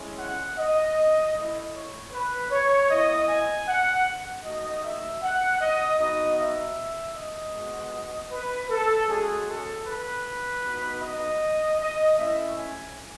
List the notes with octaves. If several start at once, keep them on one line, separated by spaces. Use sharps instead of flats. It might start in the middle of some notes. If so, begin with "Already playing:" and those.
Already playing: G#3 C#4 E4
F#5
D#5
A3 E4
C#5
B4
C#5
B3 E4 D#5
G#5
F#5
A3 D#4 F#4 D#5
E5
F#5
D#5
B3 D#4 F#4 D#5
E5
D#5
G#3 B3 F#4
B4
A4
G#3 C#4 F#4 G#4
A4
B4
B3 D#4 F#4
D#5
D#5
A3 C#4 E4 E5
G#5